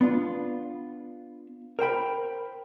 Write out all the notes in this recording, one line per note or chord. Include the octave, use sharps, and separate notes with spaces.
B3 D4 F4
A#4 C5 G5 B5